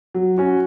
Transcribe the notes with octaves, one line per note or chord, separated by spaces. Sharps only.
F#3
C#4 F#4